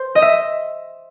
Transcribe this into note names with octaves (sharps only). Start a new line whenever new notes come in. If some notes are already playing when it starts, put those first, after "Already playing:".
Already playing: C5
D#5
E5